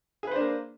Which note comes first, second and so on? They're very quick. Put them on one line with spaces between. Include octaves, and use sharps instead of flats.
G#4 B4 C5 D4 A#3